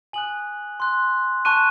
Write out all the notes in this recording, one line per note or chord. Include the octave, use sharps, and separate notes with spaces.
G#5 D#6 F#6 F#7
C6 F#6
A5 C#6 F#6 D#7